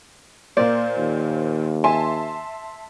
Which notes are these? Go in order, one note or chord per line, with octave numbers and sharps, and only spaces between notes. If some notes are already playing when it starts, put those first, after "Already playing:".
A#2 A#3 C5 D5
D#2
E5 G#5 A5 C6